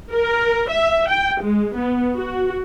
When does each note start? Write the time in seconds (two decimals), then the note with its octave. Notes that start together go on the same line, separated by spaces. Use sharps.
0.12 A#4
0.70 E5
1.09 G5
1.42 G#3
1.76 B3
2.14 F#4